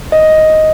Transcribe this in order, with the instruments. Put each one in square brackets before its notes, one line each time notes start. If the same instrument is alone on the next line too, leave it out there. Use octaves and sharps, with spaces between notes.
[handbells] D#5